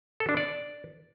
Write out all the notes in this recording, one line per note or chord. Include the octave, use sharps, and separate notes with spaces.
A4
D4
D5